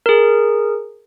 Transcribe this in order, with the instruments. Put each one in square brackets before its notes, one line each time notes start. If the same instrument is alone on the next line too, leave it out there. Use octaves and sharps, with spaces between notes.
[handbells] G#4 A#4